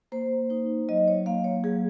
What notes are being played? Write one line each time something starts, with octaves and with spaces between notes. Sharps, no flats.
A#3 C5
D#4 C5
F#3 D#5
C#5
A#3 F5
C#5
F#3 G#4